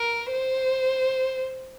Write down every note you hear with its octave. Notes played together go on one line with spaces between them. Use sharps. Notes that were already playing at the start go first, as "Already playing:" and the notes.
Already playing: A#4
C5